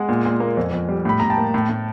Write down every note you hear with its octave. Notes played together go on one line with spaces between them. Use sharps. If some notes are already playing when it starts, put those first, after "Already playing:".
Already playing: G#3 F#5 G#5
A#2
A#2
A#3
F2
F2
G3
A2 B5
A2 A#5
G5 A5
A#3
A2
A2